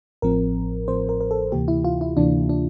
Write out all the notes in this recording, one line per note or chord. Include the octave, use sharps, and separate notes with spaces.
A1 A2 F3 C4 A#4
A1 A2 F3 C4 C5
A#4
A#4
A4
D2 C3 E3 A#3 G4
E4
F4
E4
D2 C3 E3 A#3 D4
D4